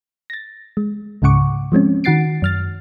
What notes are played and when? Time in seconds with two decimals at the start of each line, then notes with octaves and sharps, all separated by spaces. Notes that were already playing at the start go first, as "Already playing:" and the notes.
0.30 A6 A#6
0.77 G#3
1.22 C#2 G#2 C#3 F#5 C#6 D6
1.72 F3 G#3 C4 C#4
2.04 D#3 F#4 F#5 A6 C7 D7
2.42 F#2 F6 A6